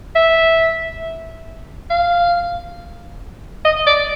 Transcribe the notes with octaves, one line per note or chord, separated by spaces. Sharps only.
E5
F5
D#5
D5